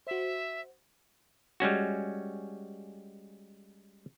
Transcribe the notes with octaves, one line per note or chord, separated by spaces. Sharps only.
F#4 C5 E5
G3 G#3 C#4 F#4